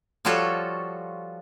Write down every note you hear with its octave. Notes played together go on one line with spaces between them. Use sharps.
F3 G3 F4 F#4 A4 C#5